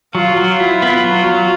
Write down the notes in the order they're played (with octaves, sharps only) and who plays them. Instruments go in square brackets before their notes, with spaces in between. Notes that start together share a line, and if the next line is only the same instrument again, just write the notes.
[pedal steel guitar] F#3 [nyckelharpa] F4
[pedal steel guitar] F#3
[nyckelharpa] F4
[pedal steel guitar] E4
B3
F#3
F#3